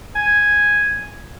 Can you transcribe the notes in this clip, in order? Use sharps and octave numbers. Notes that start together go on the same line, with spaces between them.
G#5